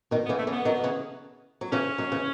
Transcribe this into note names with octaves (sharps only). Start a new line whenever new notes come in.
B2 D#3
B3
C#3 E3
A3
C#3 E3
B3
D#3 F#3
C#3 E3
F#3
C#3 E3 C#4
D#3 F#3
C#3 E3